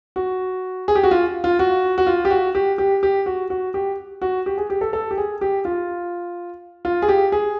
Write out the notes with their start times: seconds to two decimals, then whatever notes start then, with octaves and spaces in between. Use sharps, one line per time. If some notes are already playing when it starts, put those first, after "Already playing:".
0.16 F#4
0.88 G#4
0.95 G4
1.03 F#4
1.11 F4
1.44 F4
1.59 F#4
1.98 F#4
2.07 F4
2.25 G4
2.30 F#4
2.55 G4
2.78 G4
3.03 G4
3.26 F#4
3.50 F#4
3.74 G4
4.22 F#4
4.46 G4
4.58 G#4
4.70 G4
4.81 A4
4.93 A4
5.11 G4
5.18 G#4
5.41 G4
5.65 F4
6.85 F4
7.02 G#4
7.09 G4
7.32 G#4